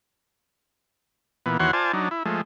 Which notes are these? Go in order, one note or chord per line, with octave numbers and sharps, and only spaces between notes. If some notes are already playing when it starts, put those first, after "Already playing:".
A#2 E3 B3
D#2 E3 F#4 C#5 F#5 C6
F4 C5 D5 G#5 A5
F#3 D4 D#4
E4
F3 G#3 A3